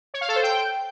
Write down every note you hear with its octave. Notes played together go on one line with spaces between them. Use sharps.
C#5
F5
A4
C5
G5